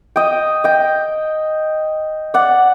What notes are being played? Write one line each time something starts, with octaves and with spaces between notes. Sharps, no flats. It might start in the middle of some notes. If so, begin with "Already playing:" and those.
D#5 G5
D#5 G5
D5 F#5